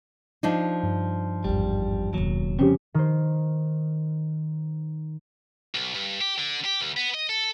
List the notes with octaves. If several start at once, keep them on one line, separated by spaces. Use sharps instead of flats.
F3 D4 D#4
G2
G#1 E2 G3
E1 D#2 C#3 F#3
C2 F2 C#3 C4 C#4 G4
D#3 C5
B1
G2
G4
D3
G4
D2
B3
D#5
A4